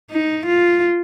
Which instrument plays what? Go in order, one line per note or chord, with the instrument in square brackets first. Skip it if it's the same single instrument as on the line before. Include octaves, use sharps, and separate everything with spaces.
[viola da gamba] D#4
F4